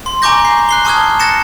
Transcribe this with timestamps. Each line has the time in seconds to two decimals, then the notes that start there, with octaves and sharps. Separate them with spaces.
0.06 C6
0.22 G#5 A#5 C#6 D6 G6 A#6
0.45 C7
0.69 F#6 C7 G7
0.85 A5 C#6 D#6 F6 F#6 G#6
1.19 F#6 A6 A#6 C#7 E7